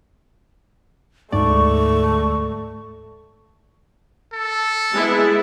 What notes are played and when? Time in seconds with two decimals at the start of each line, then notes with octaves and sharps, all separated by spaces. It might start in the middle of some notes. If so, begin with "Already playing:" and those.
1.32 D2 G#2 A3 D5 C#6
4.33 A4
4.93 G#3 B3 E4